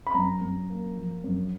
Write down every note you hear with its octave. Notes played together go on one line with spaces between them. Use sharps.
B5
F#2 A#5
F#2
A#3
F3
F#2